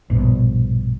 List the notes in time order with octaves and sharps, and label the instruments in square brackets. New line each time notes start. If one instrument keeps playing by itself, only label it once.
[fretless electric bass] A#1 G2 B2